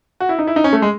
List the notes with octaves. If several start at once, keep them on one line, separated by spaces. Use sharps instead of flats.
F#4
E4
D#4
E4
D#4
C#4
A3
G#3